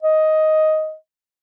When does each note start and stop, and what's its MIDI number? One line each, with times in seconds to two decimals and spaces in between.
0.03 0.95 75